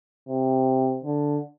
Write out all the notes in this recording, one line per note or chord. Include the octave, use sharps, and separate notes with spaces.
C3
D3